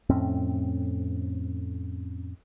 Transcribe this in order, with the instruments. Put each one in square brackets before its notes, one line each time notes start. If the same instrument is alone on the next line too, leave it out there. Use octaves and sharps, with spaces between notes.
[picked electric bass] F2 A2 C4 C#4